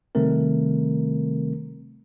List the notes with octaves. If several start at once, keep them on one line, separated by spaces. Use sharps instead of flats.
C3 D#3 G3 A3 C4 A#4